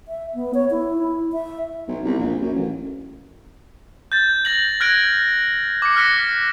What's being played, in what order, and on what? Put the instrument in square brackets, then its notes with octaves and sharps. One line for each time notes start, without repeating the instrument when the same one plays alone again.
[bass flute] E5
B3
C#5
E4
E4
E5
[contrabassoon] B1
C2
A#1
F#2
A1
[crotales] G6 A6
G6 A#6 F#7
F6 F#6 G#6 A#6 D7
D6 C#7
D6 F6 F#6 A#6 B6 C#7